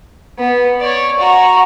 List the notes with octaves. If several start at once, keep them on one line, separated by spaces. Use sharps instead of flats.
B3
C#5 D5
F#4 A#5